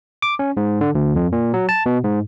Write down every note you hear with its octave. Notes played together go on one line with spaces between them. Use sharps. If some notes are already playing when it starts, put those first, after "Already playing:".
D6
C#4
G#2
D3
D2
F2
A#2
F#3
A5
B2
G#2